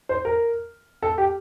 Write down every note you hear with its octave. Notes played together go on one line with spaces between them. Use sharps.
C5
A#4
A4
G4